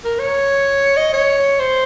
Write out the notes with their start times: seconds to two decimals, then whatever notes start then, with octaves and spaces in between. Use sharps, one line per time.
0.04 A#4
0.19 C#5
0.97 D#5
1.13 C#5
1.59 C5